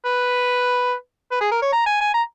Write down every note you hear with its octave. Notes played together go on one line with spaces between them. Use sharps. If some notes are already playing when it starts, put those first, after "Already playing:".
B4
B4
G#4
A#4
C#5
A#5
G#5
G#5
A#5